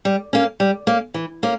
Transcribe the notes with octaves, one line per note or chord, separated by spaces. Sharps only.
G3
A#3 C#4
G3
A#3 C#4
E3
A#3 C#4